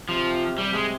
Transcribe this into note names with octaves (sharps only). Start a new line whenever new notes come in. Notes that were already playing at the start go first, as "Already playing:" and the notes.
C3 F3
C3 G3
G#3